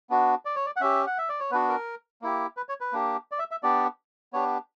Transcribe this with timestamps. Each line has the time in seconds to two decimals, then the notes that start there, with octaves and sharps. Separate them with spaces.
0.10 B3 D4 F#4
0.45 D5
0.56 C#5
0.66 D5
0.76 F#5
0.81 C#4 G4 E5
1.07 F#5
1.18 E5
1.29 D5
1.40 C#5
1.51 B3 D4 F#4 B4
1.69 A#4
2.22 A#3 E4 G4
2.57 B4
2.69 C#5
2.80 B4
2.92 A#3 D4 G4
3.32 D5
3.39 E5
3.51 E5
3.63 B3 D4 G4 D5
4.33 B3 D4 G4 C#5